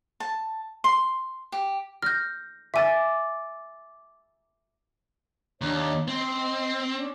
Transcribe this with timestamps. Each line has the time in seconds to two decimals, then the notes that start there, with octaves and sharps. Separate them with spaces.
0.20 A5
0.84 C6
1.52 G4
2.02 F6 G6 A#6
2.74 E5 G#5 D6 E6 A6
5.62 D#2 D4 C#5 D#5
6.08 C4 D#5 C6
6.94 C#4 D4